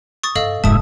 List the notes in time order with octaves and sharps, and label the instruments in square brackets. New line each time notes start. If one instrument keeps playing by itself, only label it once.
[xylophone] C#6 D#6 A6
[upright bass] G2 [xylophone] A4 D#5 F5
[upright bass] F1 D#4 [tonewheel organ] G#2 E5 [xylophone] A5 D#6